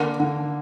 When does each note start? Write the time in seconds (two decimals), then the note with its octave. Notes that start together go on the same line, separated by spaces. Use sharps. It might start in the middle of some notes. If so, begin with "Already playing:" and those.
Already playing: D3 A#3
0.20 D3